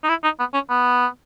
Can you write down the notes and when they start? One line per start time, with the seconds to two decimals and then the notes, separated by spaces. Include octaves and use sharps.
0.04 D#4
0.09 E4
0.24 D#4
0.39 B3
0.54 C#4
0.70 B3